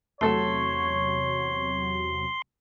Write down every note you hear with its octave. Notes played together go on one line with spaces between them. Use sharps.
E2 C3 F#3 A3 A4 C#5 C6